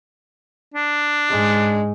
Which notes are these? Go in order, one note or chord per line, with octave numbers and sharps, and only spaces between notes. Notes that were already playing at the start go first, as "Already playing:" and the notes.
D4
G#2 G#3